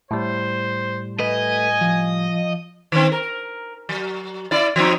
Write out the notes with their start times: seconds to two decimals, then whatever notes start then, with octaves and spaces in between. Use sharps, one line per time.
0.11 A2 G3 C5
1.19 A3 B4 D#5 G#5
1.81 F3
2.92 D#3 C4
3.12 A#4
3.89 F#3
4.51 E4 D5
4.76 F3 C4 D#4